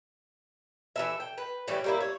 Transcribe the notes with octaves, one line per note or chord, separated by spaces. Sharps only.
E3 A4 E5
G5
B4
A2 E3 G3 G4
G3 A#3 E4
C#5